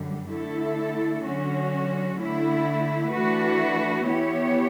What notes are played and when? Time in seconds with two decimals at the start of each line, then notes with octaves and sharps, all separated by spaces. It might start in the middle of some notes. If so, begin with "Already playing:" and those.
Already playing: F#2 D3 G3
0.30 D3 A3 E4 A4
1.24 D3 F#3 C#4 F#4
2.18 D3 A3 E4
3.10 E3 A3 D4 F#4 B4
4.05 E3 B3 E4 G4 C#5